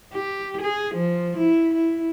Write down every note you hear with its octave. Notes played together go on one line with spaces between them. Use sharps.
G4
G#4
F3
E4
E4